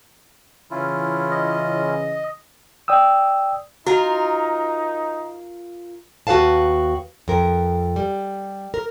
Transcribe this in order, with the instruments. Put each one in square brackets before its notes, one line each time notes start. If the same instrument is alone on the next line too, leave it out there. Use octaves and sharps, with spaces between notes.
[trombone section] C#3 E3 [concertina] C#4 E4 F4
[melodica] D#5
[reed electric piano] D5 G5 D#6 E6
[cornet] D#4 [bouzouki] F4 A#4 [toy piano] F#4
[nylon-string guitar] D#2 F#4 A4 B4 F5 A5
F2 A#4
G3
A#4